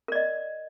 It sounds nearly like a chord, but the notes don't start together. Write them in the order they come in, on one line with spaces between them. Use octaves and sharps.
A#4 D5 D#5